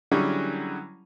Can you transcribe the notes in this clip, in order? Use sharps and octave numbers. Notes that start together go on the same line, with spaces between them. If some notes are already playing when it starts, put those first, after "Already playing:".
D3 F#3 G3 C#4 E4 G#4